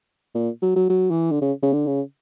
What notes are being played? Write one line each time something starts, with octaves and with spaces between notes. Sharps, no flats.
A#2
F#3
F#3
F#3
E3
D3
C#3
C#3
D3
C#3